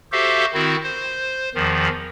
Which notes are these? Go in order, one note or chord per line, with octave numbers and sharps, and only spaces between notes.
F#4 G4 A4 C5 E5 F5
D#3 C4 E4 F#4
C5
E2 D#3 F3